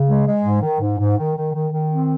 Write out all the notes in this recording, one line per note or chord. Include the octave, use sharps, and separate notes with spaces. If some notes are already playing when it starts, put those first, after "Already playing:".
Already playing: C#3
G#3
G#3
G#2
D#3
G#2
G#2
D#3
D#3
D#3
D#3
C4